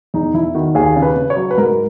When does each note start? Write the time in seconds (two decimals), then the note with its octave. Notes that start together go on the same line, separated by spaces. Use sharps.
0.14 E2 D#4
0.34 E2 E4
0.55 D#3 F#4
0.75 D#2 G#4
0.96 C#3
1.02 B4
1.16 C#3
1.30 C#5
1.36 F#3
1.51 B4
1.58 G#2 A#4